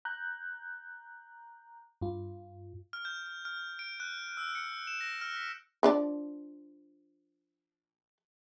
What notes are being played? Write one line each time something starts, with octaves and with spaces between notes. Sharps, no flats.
A#5 F#6 G6
G2 F4
F6
G6
F6
F6
D7
F#6
E6
C#7
E7
A#6
F6
B6
F3 D4 D5